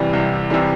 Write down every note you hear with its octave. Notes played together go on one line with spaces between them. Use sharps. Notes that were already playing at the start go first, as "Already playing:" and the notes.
Already playing: C2 C3 E3 G3
C2
C3 E3 G3